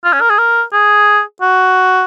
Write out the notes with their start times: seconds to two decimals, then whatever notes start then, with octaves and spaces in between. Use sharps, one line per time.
0.04 F4
0.13 C#4
0.21 A#4
0.30 G#4
0.38 A#4
0.73 G#4
1.41 F#4